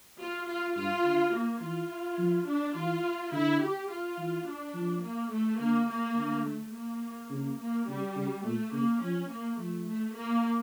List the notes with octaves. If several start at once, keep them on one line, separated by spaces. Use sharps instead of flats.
F4
F4
G2 F4
D3
A#3
E3 F4
F3
D4
E3 F4
D3 E4
G4
F4
E3
D4
F3
A#3
A3
D3 A#3
A#3
D3
A3
A#3
C#3
A#3
C#3 G3
C#3
A#2 A3
C#3 A#3
F3 C#4
A#3
F3 A3
A3
A#3